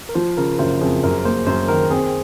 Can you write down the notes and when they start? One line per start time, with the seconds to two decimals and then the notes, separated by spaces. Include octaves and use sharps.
0.09 A#4
0.15 F3 C5
0.37 C#3 A#4
0.59 F#1 C5
0.81 F2 G#4
1.03 F#2 A#4
1.25 A#3 C5
1.47 F#2 C5
1.68 D#3 A#4
1.91 C4 G#4